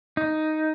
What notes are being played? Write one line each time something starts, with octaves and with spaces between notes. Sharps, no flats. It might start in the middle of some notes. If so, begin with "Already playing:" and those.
D#4